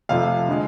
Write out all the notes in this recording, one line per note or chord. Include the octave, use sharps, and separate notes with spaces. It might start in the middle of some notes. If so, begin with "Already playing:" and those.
F2 C3 F3 A3 F5
D3 F3 G#3